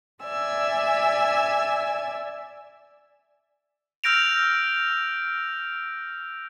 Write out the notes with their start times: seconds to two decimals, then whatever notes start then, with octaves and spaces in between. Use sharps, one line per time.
0.23 D5 E5 G#5 E6
4.04 E6 F6 G6 A#6 D7 F7